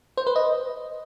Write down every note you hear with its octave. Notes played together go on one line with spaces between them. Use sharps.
C5
B4
D#5